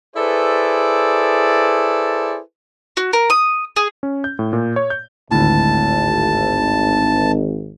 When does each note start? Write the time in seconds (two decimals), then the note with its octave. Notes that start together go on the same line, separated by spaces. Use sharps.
0.16 E4 G#4 A4 B4 C5 D5
2.97 F#4
3.13 A#4
3.30 D#6
3.76 G#4
4.03 C#4
4.24 G6
4.39 A2
4.53 A#2
4.76 C#5
4.90 G6
5.31 G#1 D2 A2 A5